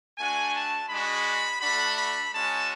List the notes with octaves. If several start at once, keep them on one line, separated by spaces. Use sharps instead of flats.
A3 D4 F#4 G#5
A5
G#3 D4 F#4 B5
A3 D4 F#4 B5
B5
G#3 C#4 F#4 A5